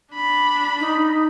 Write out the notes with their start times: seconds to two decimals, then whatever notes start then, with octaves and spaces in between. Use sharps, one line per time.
0.14 D4 B5
0.80 D#4